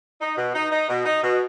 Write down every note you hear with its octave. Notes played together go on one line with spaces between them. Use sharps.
D#4
B2
D#4
D#4
B2
D#4
B2